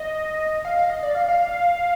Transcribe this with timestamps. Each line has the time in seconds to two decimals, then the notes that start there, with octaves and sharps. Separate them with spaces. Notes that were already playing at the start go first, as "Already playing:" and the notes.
Already playing: D#5
0.65 F5
0.78 F5
0.90 D#5
1.03 D5
1.15 F5
1.28 F5